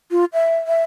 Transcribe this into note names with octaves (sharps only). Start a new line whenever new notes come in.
F4
E5
E5